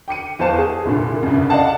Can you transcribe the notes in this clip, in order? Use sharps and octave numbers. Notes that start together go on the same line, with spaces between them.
G5 D6 C#7 D#7
E2 C5 F5 A5 E7
G#4
C2 A#2 D3
C2 G2 C#3
D5 D#5 F5 F#5 A5